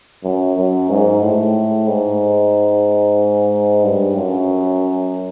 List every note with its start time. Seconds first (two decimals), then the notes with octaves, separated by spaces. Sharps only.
0.24 F#2
0.56 F#2
0.89 G#2
1.22 A2
1.87 G#2
3.84 G2
4.16 F#2